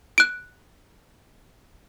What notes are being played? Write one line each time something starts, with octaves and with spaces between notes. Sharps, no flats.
F#6 D7